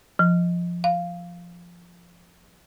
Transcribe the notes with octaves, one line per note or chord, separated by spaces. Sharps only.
F3
F5